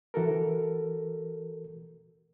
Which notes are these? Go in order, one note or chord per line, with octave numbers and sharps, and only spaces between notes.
E3 F#4 A4 A#4